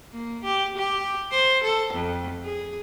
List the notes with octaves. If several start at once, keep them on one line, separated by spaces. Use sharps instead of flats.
A#3
G4
G4
C5
A4
F2
G#4